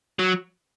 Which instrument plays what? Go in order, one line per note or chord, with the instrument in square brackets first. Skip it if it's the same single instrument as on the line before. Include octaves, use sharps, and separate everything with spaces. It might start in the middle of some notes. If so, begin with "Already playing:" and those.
[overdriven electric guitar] F#3